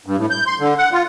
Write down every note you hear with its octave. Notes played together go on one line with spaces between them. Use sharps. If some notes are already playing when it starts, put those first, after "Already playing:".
G2
A2
G6
C6
D3
F#5
F4